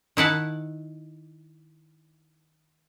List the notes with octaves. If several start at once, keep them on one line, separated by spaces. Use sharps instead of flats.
D#3 E4 F#5 A5